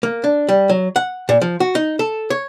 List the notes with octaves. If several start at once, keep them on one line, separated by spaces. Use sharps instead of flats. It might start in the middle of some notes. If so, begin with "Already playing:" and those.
A#3
D4
G3
F#3
F#5
A#2
F3
F#4
D#4
A4
C#5